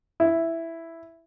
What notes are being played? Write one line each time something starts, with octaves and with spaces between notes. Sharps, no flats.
E4